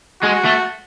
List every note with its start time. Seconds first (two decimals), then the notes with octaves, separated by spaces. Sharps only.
0.22 G#3 F#4
0.45 A3